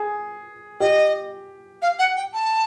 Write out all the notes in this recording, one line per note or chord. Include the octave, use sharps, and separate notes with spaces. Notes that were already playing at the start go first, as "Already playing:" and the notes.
Already playing: G#4
G4 D#5
F5
F#5
G5
A5